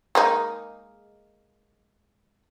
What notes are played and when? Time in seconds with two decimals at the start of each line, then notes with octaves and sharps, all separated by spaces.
0.15 G#3 A#3 D#4